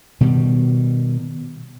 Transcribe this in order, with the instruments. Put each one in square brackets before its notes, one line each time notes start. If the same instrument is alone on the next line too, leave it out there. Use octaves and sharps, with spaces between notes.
[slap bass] B2 D#3 G3